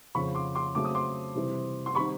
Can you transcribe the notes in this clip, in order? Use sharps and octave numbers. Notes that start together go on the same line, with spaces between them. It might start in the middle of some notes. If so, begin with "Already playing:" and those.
F2 C#3 F3 B5 C#6
C6 D6
C6 D6
C#3 F#3 A3 C4 D6
D#6
C6 D6
C3 E3 G3 C4 E4
C6
D#3 G3 C4 D#4 B5 C#6